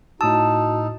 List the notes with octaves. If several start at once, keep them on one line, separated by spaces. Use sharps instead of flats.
A2 D#4 F#4 A5 D#6 E6